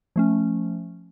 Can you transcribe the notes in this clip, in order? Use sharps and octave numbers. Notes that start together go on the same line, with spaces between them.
F3 A3 C#4